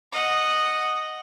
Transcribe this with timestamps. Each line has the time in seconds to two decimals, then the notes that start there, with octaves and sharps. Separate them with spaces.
0.12 D#5 F#5